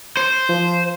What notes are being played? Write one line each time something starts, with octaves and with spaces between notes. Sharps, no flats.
C5
F3